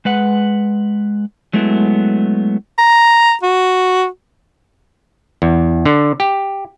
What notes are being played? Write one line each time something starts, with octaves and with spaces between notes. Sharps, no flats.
G#3 B4 F#5
F#3 G#3 A3 B3 E4
A#5
F#4
E2
D3
G4